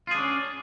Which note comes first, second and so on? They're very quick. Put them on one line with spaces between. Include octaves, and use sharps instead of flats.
F4 G#4 D4 C#4